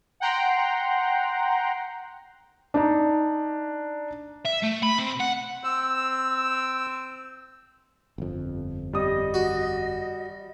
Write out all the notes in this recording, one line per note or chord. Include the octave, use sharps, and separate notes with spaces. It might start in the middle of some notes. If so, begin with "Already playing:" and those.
F#5 G5 A#5 C6
D4 D#4 A#5
E5
A3
B5
C3
F#5
C4 E6
G1 F2
G3 D#5 D#6
F#4